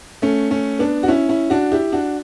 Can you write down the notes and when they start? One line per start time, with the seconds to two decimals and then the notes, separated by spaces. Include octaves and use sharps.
0.22 A3 C#4
0.51 A3 C#4
0.79 B3 D4
1.03 F#4
1.08 C#4 E4
1.29 C#4 E4
1.50 D4 F#4
1.72 E4 G4
1.92 D4 F#4